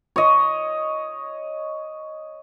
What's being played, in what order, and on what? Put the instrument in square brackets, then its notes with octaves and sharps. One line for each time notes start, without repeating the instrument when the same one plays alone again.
[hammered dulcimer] C#5 D#5